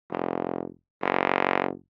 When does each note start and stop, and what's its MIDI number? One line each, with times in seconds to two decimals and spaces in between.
0.10 0.67 29
1.02 1.71 30